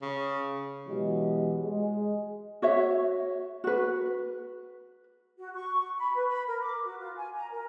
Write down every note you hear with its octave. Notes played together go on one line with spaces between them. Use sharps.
C#3
B2 E3 F#3 G#3 F#4 G4
G#3
F#4 C#5 E5
F#4 B4
F#4
C#6
B5
B4
B5
A#4
D6
F#4
F4
G#5
A#5
A#4